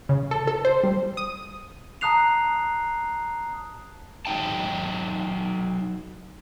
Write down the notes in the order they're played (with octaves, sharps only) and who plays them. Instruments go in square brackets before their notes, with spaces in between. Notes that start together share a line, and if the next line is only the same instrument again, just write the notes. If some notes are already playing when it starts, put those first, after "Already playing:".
[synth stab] C#3
A4
A4
C5
G3
D#6
[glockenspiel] A5 A#5 D#6 F#6 C7 F7
[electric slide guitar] F#3 D#4 G5 A5